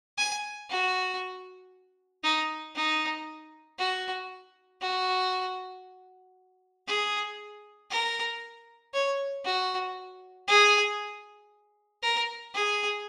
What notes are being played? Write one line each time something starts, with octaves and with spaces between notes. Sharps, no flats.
G#5
F#4
D#4
D#4
F#4
F#4
G#4
A#4
C#5
F#4
G#4
A#4
G#4